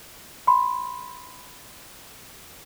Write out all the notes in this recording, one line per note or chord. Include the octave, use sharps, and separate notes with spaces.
B5 C6